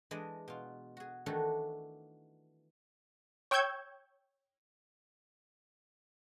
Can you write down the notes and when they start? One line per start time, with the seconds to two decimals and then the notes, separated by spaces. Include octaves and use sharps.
0.11 E3 G#3 D4 D5 D#5
0.48 B2 F4
0.97 F#4 G#4
1.26 D#3 E3 A3 D4 F#4 A4
3.51 C#5 G5 C#6 E6 G6 G#6